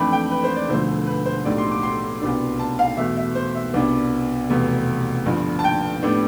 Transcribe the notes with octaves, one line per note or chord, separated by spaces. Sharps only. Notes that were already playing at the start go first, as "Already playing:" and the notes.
Already playing: F2 E3 A3 D4 B5
G5
B4
C5
D5
E1 D2 D3 F3 A3 C5
B4
C5
B1 A2 G3 D4 D5
C6
D6
C6
C2 B2 B3 D4
A5
F5
E2 B2 A3 E5
E5
C5
E5
C2 B2 B3 D4
F1 E2 B2
G1 G2 F3
A5
G5
A2 G3 B3 D4